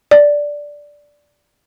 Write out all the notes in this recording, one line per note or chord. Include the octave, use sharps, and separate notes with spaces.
D5